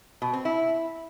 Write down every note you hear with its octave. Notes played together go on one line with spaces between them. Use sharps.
B2
C4
E4